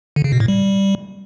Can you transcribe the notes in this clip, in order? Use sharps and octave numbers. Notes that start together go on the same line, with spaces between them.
D3
C#3
B2
A2
G3